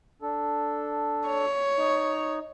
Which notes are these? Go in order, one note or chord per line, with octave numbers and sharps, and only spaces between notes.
D4 A4
C#5
D#4